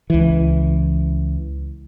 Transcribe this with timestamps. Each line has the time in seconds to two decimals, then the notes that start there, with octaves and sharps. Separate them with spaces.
0.10 C#2 E3